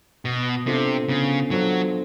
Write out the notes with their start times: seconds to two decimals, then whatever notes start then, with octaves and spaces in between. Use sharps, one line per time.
0.25 B2 B3
0.67 C3 D4 F4 A4 C5
1.09 C#3 B3
1.51 F#3 D4 F4 A4 C5